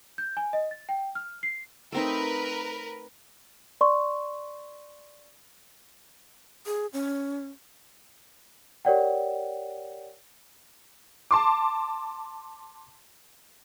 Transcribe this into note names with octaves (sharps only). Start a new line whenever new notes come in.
G6
G#5
D#5
A6
G5
F6
C7
A3 C4 D#4 A#4 B4
D5 C6 C#6
G#4
C#4
G4 A#4 C#5 D5 F#5 G5
A5 C6 D6